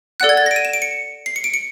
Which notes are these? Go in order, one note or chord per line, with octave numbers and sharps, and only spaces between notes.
A4 D5 F#5 F#6
G#6
A6
A#6
D7
D#7
E7
D7
C#7
C7
C#7
D7
C#7